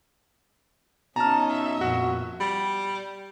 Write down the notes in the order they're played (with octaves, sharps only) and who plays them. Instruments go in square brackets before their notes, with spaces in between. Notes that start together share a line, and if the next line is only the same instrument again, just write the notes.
[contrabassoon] B2 [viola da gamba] C#4 D#4 [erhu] A5 [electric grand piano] A#5 F6
[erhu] E5
[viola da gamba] F2 A#2 [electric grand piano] F#4
[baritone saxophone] G3